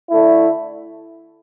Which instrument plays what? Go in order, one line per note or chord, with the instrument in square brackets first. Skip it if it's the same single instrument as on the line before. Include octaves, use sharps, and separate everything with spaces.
[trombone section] D3 A3 E4